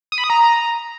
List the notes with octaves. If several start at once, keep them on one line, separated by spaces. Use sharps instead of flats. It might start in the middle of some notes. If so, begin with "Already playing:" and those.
D#6
B5
D#6
A#5